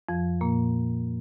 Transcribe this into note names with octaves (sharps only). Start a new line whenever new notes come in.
F2 F3
A#2 A#3